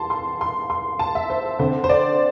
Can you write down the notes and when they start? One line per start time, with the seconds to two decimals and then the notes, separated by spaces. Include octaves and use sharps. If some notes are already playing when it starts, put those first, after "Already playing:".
Already playing: E2 G3 A5 C6
0.10 C6
0.41 C6
0.70 C6
0.99 A5
1.15 E5
1.30 C5
1.59 D3 C4 C5
1.84 C5
1.89 D5